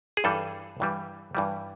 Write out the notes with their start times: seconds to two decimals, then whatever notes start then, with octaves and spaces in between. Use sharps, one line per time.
0.17 G#4
0.24 G2 E3 G3 A4
0.80 G2 E3 G3
1.35 G2 E3 G3